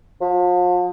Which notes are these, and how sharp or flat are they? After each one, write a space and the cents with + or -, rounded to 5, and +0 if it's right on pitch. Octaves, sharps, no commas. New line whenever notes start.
F3 +40